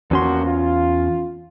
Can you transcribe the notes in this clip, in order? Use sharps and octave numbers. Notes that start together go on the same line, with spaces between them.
E2 F3 A#3 C#4 F#4 C6
F4